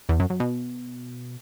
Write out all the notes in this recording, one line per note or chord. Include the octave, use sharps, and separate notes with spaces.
E2
F#2
F#2
B2